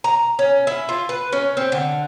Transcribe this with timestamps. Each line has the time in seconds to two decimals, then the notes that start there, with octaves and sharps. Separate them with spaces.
0.04 A#5
0.39 C#4
0.67 E4
0.89 F4
1.09 B4
1.32 C#4
1.57 C4
1.72 D3